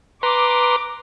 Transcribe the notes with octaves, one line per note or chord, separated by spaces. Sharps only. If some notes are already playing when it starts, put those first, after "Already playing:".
B4 A#5 C6 D6